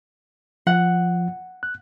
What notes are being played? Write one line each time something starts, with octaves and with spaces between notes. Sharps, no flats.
F3 F#5
F#6